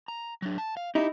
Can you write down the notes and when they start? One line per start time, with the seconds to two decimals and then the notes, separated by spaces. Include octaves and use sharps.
0.08 A#5
0.42 F#3 D4
0.58 A5
0.77 F5
0.95 D#4 E4 G4